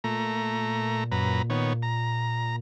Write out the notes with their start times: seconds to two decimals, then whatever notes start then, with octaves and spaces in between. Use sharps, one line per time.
0.04 A#2 A3 A#5
1.12 F#2 B4 A#5
1.50 D#3 B3 C#5
1.82 A#5